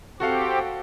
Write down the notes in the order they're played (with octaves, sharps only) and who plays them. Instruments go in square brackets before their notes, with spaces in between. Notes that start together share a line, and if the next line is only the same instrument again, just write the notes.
[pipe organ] C4 G4 [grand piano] F#4 A4 F5